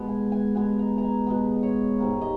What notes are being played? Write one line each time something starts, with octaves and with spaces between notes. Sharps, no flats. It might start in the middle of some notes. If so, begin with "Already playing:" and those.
Already playing: B2 G#3 B3
G#5
G#5
B2 G#3 B3 G#5
A#5
G#5 A#5
B2 G#3 B3 D#5
C#5
G#2 G3 A#3
D#5